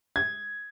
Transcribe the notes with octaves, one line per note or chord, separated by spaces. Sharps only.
G#6